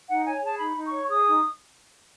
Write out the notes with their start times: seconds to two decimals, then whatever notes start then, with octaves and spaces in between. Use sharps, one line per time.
0.09 D#4 F#5
0.25 C#5 G#5
0.43 G#4 A5
0.59 D#4 B5
0.77 D#4
0.84 C#6
0.93 C#5
1.09 G#4 D#6
1.26 D#4